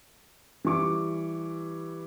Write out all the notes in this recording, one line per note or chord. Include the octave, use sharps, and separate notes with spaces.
E3 G3 C#6 D6